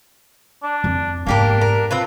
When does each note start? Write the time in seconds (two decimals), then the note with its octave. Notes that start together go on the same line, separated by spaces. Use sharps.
0.63 D4
0.84 F2
1.27 G#2 A#3 B3 D4 G4 A#4
1.61 A#4
1.91 C4 F4 B4